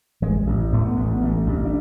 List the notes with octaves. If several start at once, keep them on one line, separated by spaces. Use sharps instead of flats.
A1 G#3
A1
A2 A3
B3
A1 A3
B3
A1 A3
A1
D4